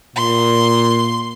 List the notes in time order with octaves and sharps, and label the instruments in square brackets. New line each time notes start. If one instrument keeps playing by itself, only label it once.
[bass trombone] A#2 [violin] C6